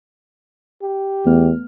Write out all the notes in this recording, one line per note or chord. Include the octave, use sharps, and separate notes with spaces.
G4
E2 A3 B3 F6